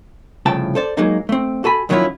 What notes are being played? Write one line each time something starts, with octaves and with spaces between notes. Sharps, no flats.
C2 A2 C#3 F3 G5 A5
A4 C5 D5
F#3 G#3 A#3 D#4
A3 C4
F#4 A4 G#5 B5
F2 D#3 F#3 C#4 E4 F4